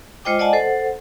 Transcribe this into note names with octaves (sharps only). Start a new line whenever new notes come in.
G#3 F4 C5 D#5 G5 D6
D5 D#5 F#5 G#5 A5
A4 C5 F#5